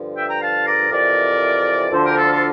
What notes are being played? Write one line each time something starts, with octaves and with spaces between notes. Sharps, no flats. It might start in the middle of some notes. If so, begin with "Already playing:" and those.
Already playing: G2 D3 F3
E5 G5
G5 A#5
F5 A5
A#4 D5
F2 C3 E3 A#4 D5
D2 D3 F3 A4 C5
G4 A#4
F4 A4
F4 A4